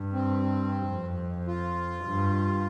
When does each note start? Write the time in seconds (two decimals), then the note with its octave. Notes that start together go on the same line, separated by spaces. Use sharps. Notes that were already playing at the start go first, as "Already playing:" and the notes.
Already playing: G2
0.13 C4
0.89 F2
1.47 F4
2.05 G2